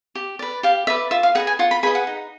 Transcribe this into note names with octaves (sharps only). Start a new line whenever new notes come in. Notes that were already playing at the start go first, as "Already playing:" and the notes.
G4
B4 D5
G4 F5
B4 D5 E5
F4 E5
F5
G#4 B4 D#5 F#5
G#5
F4 F#5
B5
G#4 B4 D#5 B5
F#5
D#4